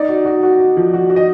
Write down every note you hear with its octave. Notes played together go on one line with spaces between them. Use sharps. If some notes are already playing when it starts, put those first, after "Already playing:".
Already playing: D#4 D5
F#4
F#4
F#4
F#4
F3
F#4
F#4
D#5